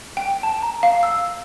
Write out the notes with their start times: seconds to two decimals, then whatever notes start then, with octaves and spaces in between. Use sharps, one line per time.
0.17 G5
0.43 A5
0.62 A#5
0.83 F5
1.03 E6